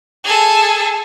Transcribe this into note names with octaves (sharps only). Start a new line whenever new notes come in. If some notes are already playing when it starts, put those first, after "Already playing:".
G#4 A4